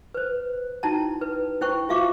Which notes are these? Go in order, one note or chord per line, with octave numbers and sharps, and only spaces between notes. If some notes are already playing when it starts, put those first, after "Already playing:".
B4 C5
D#4 E4 F#4 G5 A5 A#5
B4
E4 C5 G5 C#6
F4 F#4 E5 F5 C#6 D6